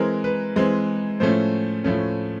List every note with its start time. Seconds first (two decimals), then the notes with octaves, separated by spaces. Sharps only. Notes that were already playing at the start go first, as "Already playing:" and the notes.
Already playing: E3 G#3 C4 A#4
0.24 B4
0.56 E3 G#3 C4
1.20 A2 F3 A3 C#4 C5
1.84 A2 F3 A3 C#4